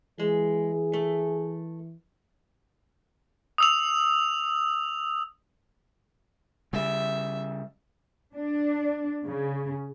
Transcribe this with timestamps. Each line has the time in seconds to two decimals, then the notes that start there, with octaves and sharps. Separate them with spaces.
0.20 E3 G#3 G#4
0.93 A3
3.58 D#6 E6 F7
6.73 C#3 G3 E5
8.35 D4
9.26 C#3